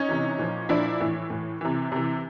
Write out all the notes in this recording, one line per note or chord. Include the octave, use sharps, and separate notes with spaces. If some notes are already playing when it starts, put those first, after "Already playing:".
Already playing: C#4 D#4
C3 E3
A#2 F3
A#2 F3 D4 E4
A2 E3
A2 E3
C3 E3
C3 E3